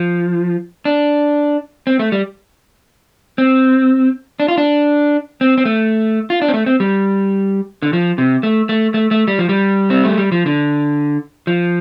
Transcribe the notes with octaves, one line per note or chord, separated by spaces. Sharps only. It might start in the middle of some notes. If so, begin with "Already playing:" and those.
Already playing: F3
D4
C4
A3
G3
C4
D4
F4
D4
C4
C4
A3
F4
D4
C4
A3
C4
G3
D3
F3
C3
A3
A3
A3
A3
G3
F3
G3
C4
A3
G3
F3
D3
F3